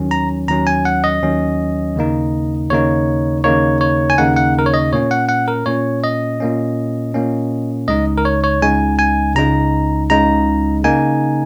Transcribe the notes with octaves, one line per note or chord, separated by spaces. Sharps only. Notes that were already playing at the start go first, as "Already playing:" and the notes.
Already playing: D#2 D#3 F#3 C#4
A#5
D#2 D#3 F#3 C#4 A#5
G#5
F#5
D#5
D#2 D#3 F#3 C#4
D#2 C#3 A#3 D#4
D#2 C#3 A#3 D#4 C#5
D#2 C#3 A#3 D#4 C#5
C#5
G#5
D#2 C#3 A#3 D#4 F#5
F#5
A#4
C#5
D#5
A#2 A#3 C#4 C#5
F#5
F#5
A#4
A#2 A#3 C#4 C#5
D#5
A#2 A#3 C#4
A#2 A#3 C#4
C#2 C#3 G#3 D#4 D#5
A#4
C#5
C#5
C#2 C#3 G#3 D#4 G#5
G#5
C#2 C#3 G#3 D#4 A#5
C#2 C#3 G#3 D#4 A#5
C#3 A#3 D#4 G#5